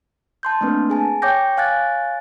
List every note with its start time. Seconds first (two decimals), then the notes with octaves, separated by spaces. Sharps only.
0.43 A5 C6 G6
0.61 A3 A#3 C4 D4 B4
0.90 G#4 G#5 A5
1.22 C#5 G5 D6 G6 A#6
1.57 C#5 F5 G#5 F#6 G#6 A6